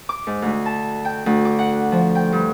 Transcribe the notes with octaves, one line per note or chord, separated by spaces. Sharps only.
D6
G#2
D2
A5
G5
D2
D6
F#5
F3
G5
G2